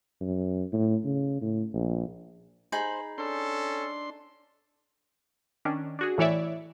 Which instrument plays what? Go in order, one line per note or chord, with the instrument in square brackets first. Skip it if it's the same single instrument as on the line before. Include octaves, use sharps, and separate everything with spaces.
[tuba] F#2
A2
C#3
A2
A#1
[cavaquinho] D#4 G#4 B5 [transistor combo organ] C5
[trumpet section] C#4 A4 [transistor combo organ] D4 C6
[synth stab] D#3 C#4 D4
D4 F#4 G#4
A2 E3 E4 C#5 D5 E5